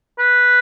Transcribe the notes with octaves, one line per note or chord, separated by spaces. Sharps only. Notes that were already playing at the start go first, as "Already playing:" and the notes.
B4